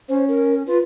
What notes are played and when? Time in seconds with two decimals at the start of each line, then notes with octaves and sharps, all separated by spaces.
0.09 C#4 C5
0.28 A#4
0.67 F4 B4